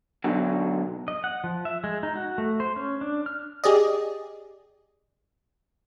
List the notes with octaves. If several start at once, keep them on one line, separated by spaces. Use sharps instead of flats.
B2 D3 F#3
D#5
F#5
F3
E5
G#3
D#4
F#4
A3
C5
C#4
D4
F6
G4 G#4 D5 D#5